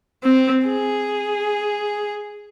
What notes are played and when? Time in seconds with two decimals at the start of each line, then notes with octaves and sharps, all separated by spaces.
0.24 C4
0.67 G#4